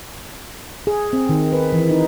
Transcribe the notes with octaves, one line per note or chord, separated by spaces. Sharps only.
G#4
C4
D#3
B4
E3
D#4